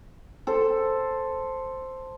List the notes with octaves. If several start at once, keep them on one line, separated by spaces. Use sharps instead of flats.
A4 C5